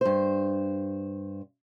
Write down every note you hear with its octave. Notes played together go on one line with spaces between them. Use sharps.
G2 C5